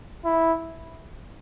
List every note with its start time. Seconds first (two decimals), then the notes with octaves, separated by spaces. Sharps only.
0.25 E4